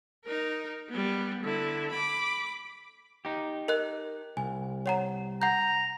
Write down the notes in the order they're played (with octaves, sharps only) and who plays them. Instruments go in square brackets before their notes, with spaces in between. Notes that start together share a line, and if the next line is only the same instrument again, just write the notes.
[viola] D#4 A#4
G3 B3
D3 E4
B5 D6
[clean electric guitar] D#4 G4
[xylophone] A#4 D#5 F#6
[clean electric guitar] C2 [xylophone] G#5
[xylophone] C#5 F#5 A#5
[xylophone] F#5 G6 [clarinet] A#5